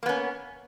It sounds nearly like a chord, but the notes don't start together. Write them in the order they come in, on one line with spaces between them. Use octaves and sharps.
A#3 B3 C#4